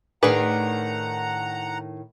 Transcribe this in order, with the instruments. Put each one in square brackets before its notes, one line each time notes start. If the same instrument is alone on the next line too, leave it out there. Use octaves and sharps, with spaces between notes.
[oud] A2 D#3 [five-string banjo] D4 G#4 B4 [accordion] F#5 A#5